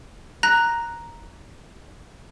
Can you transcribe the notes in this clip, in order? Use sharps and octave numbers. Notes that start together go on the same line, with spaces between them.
A#5 F#6 A#6